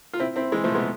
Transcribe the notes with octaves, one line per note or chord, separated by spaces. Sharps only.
F4
C4 E4
C4 E4
E3 G#3
F3 A3
G#3 B3